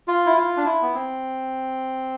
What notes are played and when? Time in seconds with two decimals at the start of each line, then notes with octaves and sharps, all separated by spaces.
0.08 F4
0.27 E4
0.37 F4
0.57 D4
0.65 E4
0.82 B3
0.94 C4